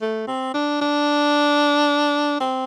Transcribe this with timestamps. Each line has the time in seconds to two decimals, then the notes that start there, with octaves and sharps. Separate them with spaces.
0.01 A3
0.27 C4
0.54 D4
0.81 D4
2.40 C4